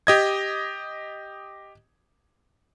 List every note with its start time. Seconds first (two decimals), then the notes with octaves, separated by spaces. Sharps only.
0.07 G4 D#5 G#6